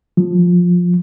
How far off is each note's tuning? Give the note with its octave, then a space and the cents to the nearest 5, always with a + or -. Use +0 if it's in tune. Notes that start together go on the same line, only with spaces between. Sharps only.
F3 +15